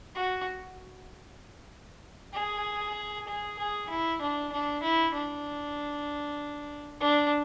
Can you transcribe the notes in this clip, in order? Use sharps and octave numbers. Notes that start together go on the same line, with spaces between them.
F#4
G#4
G#4
G#4
E4
D4
D4
E4
D4
D4